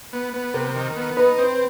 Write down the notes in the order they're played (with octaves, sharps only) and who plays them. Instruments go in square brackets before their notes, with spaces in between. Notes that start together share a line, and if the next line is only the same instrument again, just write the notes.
[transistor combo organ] B3
B3
[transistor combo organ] C3 [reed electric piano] A#4
[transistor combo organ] D#3
B3
[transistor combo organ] D#4 [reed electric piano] B4
[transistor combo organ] C4